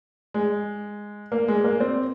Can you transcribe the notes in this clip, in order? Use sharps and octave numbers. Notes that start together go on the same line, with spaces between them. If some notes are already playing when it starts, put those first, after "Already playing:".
G#3
A#3
G#3
A#3
C4